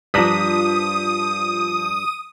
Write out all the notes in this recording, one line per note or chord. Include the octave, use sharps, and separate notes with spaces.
G2 F3 D4 A#5 D#6 B6